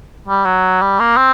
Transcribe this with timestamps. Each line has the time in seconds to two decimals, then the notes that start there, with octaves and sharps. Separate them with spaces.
0.28 G3
0.45 F#3
0.82 G3
1.00 A#3
1.17 C4